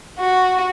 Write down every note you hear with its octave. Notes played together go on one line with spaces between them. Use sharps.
F#4